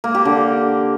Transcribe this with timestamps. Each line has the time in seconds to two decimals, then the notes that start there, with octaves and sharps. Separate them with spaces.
0.04 A#3
0.15 G4
0.25 D3